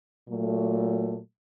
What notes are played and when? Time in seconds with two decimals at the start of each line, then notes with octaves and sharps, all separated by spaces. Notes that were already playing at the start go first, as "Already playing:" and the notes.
0.27 A#2 F#3 A3